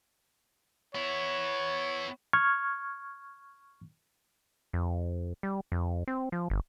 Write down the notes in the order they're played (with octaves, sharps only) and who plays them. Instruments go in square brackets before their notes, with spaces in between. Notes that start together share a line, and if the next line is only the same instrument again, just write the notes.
[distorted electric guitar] B3 E4 [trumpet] C#5
[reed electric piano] C#6 F6 G#6
[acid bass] F2
G3
F2
C4
F3
G1